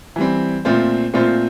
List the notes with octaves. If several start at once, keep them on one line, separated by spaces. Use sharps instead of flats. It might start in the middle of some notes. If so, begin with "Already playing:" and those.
E3 G3 C4
A#2 A3 C4 F4 C5
A#2 A3 C4 F4 C5